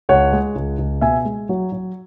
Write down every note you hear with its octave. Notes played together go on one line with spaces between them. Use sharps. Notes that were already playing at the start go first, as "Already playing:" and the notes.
C#2 C#5 F#5
G#3
C#2
C#2
B2 E5 G#5
G#3
F#3
F#3